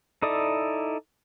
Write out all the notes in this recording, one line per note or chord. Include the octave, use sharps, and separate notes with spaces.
D#4 E4 A4 D5 D#6